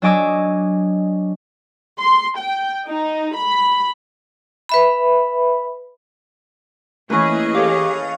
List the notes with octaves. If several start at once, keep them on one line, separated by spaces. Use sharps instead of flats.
F#3 D4 D#5 G#5 D6 E6
C6
G5
D#4
B5
B4 E5 B5
E3 A3 A#3 C#4 E4 G#4 B4 D#5
G4 A4 C#5 F5